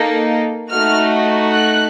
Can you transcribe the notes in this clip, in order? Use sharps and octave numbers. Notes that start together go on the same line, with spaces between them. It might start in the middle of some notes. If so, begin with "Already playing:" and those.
Already playing: A#3 D#4 A4
A3 D#4 F#4 F6
F#6